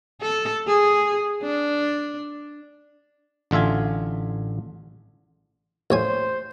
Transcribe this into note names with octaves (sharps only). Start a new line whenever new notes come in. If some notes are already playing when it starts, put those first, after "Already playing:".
A4
G#4
D4
A1 D3 F4 E5 G#5
A1 C5 C#5 G#5